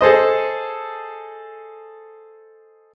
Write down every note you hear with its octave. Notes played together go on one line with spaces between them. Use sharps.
G#4 A4 C5 D#5